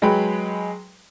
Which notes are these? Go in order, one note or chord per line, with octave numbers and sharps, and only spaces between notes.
F#3 G#3 G#4 B4 G5 B5